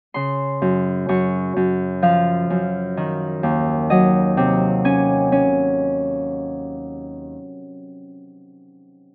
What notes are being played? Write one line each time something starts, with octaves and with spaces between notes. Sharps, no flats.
C#3 C6
F#2
F#2 C#6
F#2
F3 F5
F#2
D#3
D#2
F#3 D#5
C3
C#4 G#5
C#4